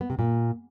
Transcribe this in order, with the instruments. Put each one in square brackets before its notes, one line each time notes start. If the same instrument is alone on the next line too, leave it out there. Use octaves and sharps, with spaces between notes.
[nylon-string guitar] B3
C3
A#2